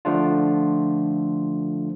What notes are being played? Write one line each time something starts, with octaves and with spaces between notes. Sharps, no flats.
D3 F3 A3 D4 F4